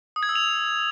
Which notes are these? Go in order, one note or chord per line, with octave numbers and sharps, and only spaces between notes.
D#6
G#6
E6
F7